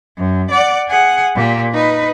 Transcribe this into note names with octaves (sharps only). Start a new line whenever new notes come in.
F#2
D5 F#5
G#4 F#5
A#2 G4
D#4 B4